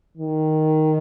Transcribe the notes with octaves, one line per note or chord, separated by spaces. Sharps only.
D#3